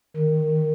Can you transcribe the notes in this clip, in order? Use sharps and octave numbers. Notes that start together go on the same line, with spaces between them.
D#3